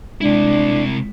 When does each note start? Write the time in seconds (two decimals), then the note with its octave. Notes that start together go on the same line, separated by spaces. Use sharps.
0.21 C3 G#3 D4 E4